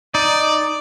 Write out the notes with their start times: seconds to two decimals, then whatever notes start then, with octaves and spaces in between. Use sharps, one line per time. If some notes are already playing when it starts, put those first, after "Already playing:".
0.15 D#4 D5